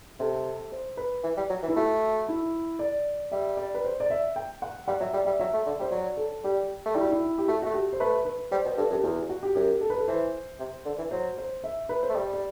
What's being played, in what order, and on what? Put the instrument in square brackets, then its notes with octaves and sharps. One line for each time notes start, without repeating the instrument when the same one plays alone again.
[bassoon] C3 [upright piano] A4
[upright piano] C5
B4
[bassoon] E3
G3
F#3
E3
[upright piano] E4
[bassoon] A3 [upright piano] F#4
[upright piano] E4
D5
[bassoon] G3 [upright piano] E5
[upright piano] D5
B4
C5
D5
E5
G5
F#5
[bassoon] G3 [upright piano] F#5
[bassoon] F#3 [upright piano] E5
[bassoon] G3 [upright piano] D5
[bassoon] G3 [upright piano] E5
[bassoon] F#3 [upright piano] E5
[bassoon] A3
D3
[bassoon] G3 [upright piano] C5
[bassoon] F#3 [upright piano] D5
[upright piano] A4
[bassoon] G3 [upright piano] G4
[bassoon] A3
[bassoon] G3 [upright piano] E4
[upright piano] F#4
E4
G4
[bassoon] A3 [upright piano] F#4
[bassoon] A3 [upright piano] F#4
[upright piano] G4
C5
[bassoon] A3 [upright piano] B4
[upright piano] B4
[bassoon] G3 [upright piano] C5
[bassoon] B2
[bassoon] G2 [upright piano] A4
[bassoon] F#2 [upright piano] G4
[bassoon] E2 [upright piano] F#4
[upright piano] F#4
G4
[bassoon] F#2 [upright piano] G4
[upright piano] A4
B4
A4
[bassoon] E3 [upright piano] C5
[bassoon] C3
D3
E3
[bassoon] F#3 [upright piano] C5
[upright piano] C5
E5
B4
C5
[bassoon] A3
[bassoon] G3 [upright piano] D5
[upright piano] D5